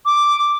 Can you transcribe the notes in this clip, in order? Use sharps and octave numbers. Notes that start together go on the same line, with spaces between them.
D6